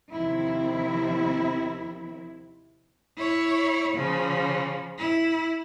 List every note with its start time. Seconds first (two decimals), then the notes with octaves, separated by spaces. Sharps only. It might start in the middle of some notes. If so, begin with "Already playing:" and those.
0.11 D#2 C3 D#3 F3 C4 E4
3.17 E4 C#5
3.96 C#3 F3
4.98 E4